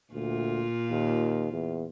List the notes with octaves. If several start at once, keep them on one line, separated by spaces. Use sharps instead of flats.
D2 A#2 F4
D#2
E2